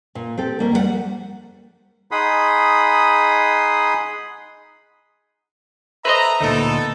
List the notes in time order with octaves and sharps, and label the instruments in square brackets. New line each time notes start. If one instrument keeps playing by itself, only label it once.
[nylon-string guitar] A#2
C4 G4 A4
D2 G3 A#3 A#4 D#5 E5
F2 G3 A4 F#5
[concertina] D#4 G#4 F#5 B5 C6 D#6
[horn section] A4 E5 A#5 [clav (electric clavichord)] B4 C5 D#5
[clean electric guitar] D2 A#2 [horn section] B3 D#4 A4